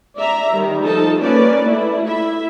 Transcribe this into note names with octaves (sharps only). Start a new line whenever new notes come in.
D5 E5 A#5
D#3 G3
F3 D#4 A4 A5
A#3 C#4 B4 D5
A3 E4
E4 E5